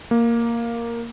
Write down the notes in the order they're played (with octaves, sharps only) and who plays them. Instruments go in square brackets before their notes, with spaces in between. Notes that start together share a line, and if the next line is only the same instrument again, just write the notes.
[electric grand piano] A#3